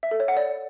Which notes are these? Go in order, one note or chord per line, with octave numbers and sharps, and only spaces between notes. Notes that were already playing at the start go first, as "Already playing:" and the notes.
E5
A4
C#5
F#5
D5